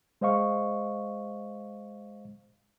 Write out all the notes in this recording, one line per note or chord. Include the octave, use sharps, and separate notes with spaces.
G#3 C5 D#5 F5 C#6